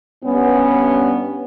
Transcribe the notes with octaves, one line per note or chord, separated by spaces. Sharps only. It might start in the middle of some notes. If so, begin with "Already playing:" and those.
G2 B3 C#4